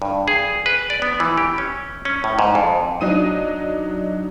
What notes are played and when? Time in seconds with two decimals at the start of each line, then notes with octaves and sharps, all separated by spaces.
0.02 G2
0.28 G#4
0.66 B4
0.90 D5
1.02 B3
1.20 E3
1.38 G4
1.58 C#4
2.05 C#4
2.24 A2
2.39 G#2
2.55 F2
3.01 F#3 D4 D#4 D#6 D#7